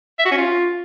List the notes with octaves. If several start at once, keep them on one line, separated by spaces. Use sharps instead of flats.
E5
F#4
C#4
F4